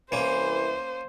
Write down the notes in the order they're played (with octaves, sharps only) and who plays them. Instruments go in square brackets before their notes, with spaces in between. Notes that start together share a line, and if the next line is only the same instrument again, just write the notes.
[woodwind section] C2 E3 [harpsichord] A#3 C#4 [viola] C5